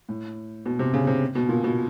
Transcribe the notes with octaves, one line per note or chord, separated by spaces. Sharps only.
A2
B2
C3
C#3
C3
B2
A#2
B2